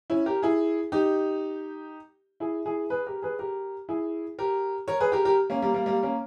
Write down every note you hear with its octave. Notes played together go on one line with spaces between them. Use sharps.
C#4 E4
G4 A#4
E4 G#4
D#4 G4
E4 G#4
E4 G#4
G#4 B4
G4 A#4
G#4 B4
G4 A#4
E4 G#4
G4 A#4
A#4 C#5
G#4 B4
G4 A#4
G4 A#4
A#3 C#4
G3 A#3
G3 A#3
G3 A#3
A#3 C#4